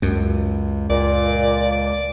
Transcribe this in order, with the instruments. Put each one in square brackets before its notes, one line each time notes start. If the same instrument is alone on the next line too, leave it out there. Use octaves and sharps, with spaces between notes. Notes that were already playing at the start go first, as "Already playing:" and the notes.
[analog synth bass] C#2 [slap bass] F#2
[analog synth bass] C#2 [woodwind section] A#2 [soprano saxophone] D5
[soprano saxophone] D5